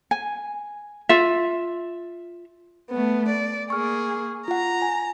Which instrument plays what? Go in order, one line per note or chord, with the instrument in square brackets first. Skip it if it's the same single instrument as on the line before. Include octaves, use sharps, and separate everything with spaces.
[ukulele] G#5
F4 E5
[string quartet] A3 B3
D5
[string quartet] A#3 G#4 [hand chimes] C#6 F6
[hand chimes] F4 F#5 [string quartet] A#5
[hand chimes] G#5